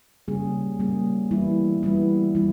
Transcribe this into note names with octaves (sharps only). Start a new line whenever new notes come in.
C#3 G3 A#3 C#4 G#4
C#3 G3 A#3 C#4 G#4
E3 G3 B3 E4
E3 G3 B3 E4
E3 G3 B3 E4